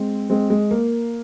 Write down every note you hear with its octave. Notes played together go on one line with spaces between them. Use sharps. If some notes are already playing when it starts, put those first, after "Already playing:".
Already playing: G#3 C4
G#3 C4
G#3
A#3